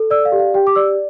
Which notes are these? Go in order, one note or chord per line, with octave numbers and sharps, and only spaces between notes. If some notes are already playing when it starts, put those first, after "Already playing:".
Already playing: A4
D5 E6
F5
G4
F5
G4 G5
D6
D5 E6